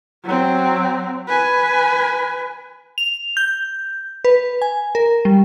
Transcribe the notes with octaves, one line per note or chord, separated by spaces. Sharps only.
F#3 C4
B4 G#5
F7
G6
B4
G#5
A#4
G3